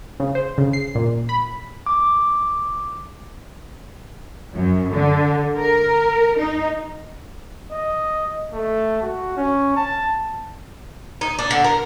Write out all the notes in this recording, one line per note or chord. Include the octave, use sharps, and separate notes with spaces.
C#3
C5
C#3
C7
A#2
B5
D6
F#2
D3
A#4
D#4
D#5
A3
F#4
C#4
A5
D#4
D4
D3
A#4